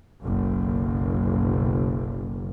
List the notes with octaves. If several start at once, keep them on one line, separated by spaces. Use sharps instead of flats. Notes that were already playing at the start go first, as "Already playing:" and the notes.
F#1 B1